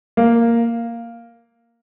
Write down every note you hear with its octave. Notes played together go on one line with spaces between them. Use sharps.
A#3